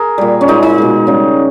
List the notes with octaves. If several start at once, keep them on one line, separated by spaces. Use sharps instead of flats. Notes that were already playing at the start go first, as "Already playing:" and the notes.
Already playing: G#4 A#4
A#2 G3
C#4
A#2 G#3 D#4
D#4
B2 G#3
C#3 G3